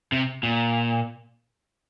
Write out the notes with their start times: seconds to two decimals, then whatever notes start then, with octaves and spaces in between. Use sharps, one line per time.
0.12 C3
0.43 A#2